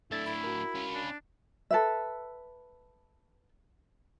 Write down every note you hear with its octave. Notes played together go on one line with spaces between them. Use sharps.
A2 D4 E4 A4 E5 A6
E4 B5
F#4 A#4
C#4 F4
D4
A4 B4 E5